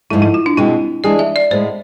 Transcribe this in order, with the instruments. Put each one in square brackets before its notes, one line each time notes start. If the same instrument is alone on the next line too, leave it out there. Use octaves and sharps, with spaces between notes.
[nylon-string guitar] G#2 F3 A3 [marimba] E4
[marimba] E4
F4
D4
[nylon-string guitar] B2 G#3 C4 [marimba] E4
[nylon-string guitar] E3 G#3 D4 G#4 [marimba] D5
[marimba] E5
D5
[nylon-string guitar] A2 G#3 B3 [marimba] C5